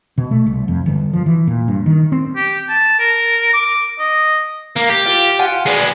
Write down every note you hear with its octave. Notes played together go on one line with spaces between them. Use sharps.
B2
A3
C2
F2
G1
F3
E3
A#2
G2
D#3
C4
G4
A5
A#4
D6
D#5
A#3
G4
F4
F4 F#5 G#5
G#3 B3 D4 G#4